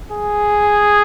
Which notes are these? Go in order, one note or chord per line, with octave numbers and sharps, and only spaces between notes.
G#4